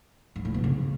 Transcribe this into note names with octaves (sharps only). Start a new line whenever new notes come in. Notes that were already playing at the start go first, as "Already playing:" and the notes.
G#2
A2
B2
C#3